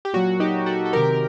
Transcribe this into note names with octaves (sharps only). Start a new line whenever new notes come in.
G4
A#2 F#3 F#4
D#4 G4
F#4 A4
A4
C3 D#3 F#3 G4 A#4